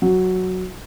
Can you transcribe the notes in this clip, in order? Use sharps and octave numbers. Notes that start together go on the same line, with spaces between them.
F#3